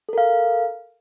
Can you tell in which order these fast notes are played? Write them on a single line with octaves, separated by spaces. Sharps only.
A4 A#4 F5